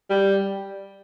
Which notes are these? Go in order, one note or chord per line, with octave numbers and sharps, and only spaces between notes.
G3